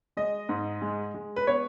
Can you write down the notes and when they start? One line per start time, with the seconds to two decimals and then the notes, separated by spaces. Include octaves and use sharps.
0.17 G#3 D#5
0.49 G#2
0.82 G#3
1.14 G#3
1.36 B4
1.47 B3 C#5